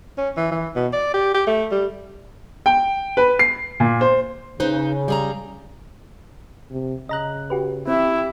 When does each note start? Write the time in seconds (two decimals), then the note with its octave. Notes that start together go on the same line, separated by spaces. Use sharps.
0.18 C#4
0.37 E3
0.51 E3
0.76 B2
0.93 D5
1.14 G4
1.34 G4
1.47 A3
1.71 G3
2.66 G5
3.17 B4
3.39 C7
3.80 A#2
4.01 C5
4.60 C#3 D#4 B4 C5
5.08 G3 G#4 A#5
6.71 C3
7.09 C#3 D#5 A#5 F#6
7.50 F#4 G4 B4
7.87 C4 E4 G4 E5